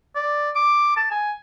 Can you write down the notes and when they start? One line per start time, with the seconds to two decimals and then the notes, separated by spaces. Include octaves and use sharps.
0.15 D5
0.56 D6
0.97 A5
1.11 G#5